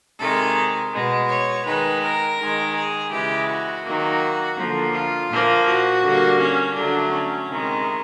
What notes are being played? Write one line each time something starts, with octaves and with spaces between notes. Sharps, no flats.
C3 D#3 G#3 A4
B2 G#3
C#5
D#3 G#3 B4
A#4
D#3 G#3
G#4
C#3 E3 G#3 G4
F#4
D#3 F#3 A#3
D3 F3 A#3
F4
A#2 F3 A#3
F#4
D3 G3 A#3
C#4
D3 F#3 A3 D4
C#4
C3 D#3 G#3